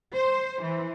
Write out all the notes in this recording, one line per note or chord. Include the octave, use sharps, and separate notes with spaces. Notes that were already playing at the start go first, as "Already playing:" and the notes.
C5
E3